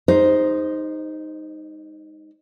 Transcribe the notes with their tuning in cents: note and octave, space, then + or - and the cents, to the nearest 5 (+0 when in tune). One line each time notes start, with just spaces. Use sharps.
G#3 -40 D#4 +0 C5 +0